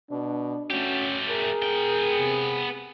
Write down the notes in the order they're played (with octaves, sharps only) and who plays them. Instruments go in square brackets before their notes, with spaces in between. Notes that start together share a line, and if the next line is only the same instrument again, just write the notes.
[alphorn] B2 [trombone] D4
[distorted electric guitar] A3 G4 [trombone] C#4 [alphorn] F#4
[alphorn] G#4 [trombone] A#4
[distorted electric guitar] B3 G5
[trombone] C3